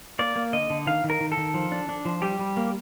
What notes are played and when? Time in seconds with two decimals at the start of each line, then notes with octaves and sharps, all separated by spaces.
0.19 A#3 D5
0.36 A#3
0.53 D3 D#5
0.70 D3
0.87 D#3 F5
1.04 D#3
1.10 A#4
1.21 D#3
1.32 A4
1.37 D#3
1.54 F3
1.72 D4
1.89 D4
2.05 F3
2.22 G3 G4
2.39 G3
2.57 A#3